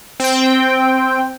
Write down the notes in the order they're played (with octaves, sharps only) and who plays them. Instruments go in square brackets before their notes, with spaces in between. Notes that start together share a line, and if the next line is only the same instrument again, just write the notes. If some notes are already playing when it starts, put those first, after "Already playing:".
[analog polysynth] C4 G5